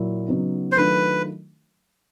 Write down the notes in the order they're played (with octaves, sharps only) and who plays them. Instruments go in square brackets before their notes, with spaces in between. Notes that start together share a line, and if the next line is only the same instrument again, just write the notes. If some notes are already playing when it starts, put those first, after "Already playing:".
Already playing: [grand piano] A#2 F#3 E4
C#3 F#3 B3 D#4
[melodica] C5
[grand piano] D#3 F#3 A3 D4 F4 [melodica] B4